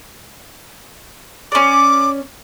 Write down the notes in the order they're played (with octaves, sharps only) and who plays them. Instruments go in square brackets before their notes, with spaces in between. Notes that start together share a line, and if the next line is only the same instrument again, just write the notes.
[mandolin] C#4 D5 [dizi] D6